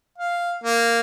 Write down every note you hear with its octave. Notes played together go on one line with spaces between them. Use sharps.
F5
A#3